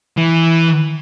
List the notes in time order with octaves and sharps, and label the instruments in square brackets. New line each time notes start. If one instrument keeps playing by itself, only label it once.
[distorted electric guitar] E3